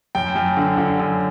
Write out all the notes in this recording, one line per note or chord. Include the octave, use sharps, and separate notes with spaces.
F#2 G5
F#2
D3
D3
F#2